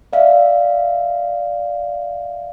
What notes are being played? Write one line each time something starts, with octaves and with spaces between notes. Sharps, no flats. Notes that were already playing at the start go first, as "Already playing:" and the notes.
D5 E5 F5